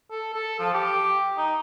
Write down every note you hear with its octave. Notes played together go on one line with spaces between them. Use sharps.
A4
A4
F3
G4
D#4